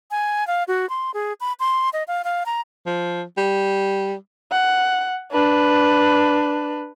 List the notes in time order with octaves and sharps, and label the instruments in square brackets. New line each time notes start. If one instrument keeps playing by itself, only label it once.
[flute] G#5
F5
F#4
C6
G#4
B5
C6
D#5
F5
F5
A#5
[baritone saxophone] F3
G3
[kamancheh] F#5
D4 B4